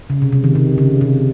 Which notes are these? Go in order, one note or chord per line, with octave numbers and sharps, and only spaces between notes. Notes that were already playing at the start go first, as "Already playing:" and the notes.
C#3
C3
C3
D#3
C3
C#3
C3